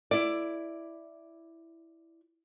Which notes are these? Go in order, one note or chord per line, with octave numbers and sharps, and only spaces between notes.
E4 D5